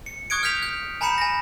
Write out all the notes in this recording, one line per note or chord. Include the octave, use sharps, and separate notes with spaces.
C#7
C#6 D#6 F#6 G#6 C#7 D7
F6 G6 G#6 B6 F7
G6
G#5 A#5 B5 G6 C#7 E7
G#5 A#6